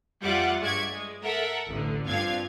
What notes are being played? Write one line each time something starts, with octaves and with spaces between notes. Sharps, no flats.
F2 G3 F4 E5 F#5 D6
G2 G#3 D5 E5 C#6 G#6
G#3
A4 A#4 E5 F#5
A1 D2 D3
G2 F3 C4 D4 F5 G#6